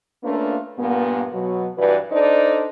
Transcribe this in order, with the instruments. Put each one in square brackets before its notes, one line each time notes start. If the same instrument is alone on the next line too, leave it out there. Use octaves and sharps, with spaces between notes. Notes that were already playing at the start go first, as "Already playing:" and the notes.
[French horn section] A3 A#3 C#4 D4 F4 B4
G2 A#2 A#3 B3
B2 F#3
G2 E3 F#4 B4 D5
D4 D#4 A4 C5 D5